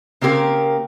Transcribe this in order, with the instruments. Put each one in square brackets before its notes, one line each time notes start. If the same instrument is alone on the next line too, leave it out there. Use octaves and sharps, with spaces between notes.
[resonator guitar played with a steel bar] C#3 A#3 C4 G4 A#4